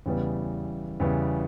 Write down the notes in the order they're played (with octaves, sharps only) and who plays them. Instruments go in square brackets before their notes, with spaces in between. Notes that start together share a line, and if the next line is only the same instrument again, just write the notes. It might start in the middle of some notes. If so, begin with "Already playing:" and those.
[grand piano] E2 C#3 G3 B3
E2 C#3 G3 B3